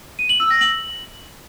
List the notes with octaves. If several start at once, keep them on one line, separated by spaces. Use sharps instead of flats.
D#7
F#7
E6
A#6
F#7